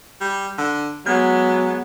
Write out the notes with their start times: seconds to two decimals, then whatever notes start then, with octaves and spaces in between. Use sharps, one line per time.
0.21 G3
0.58 D3
1.06 F#3 G#3 B3